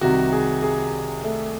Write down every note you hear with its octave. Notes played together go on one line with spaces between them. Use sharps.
C2 C3 D#3 F#4
G#4
G#4
A3 A4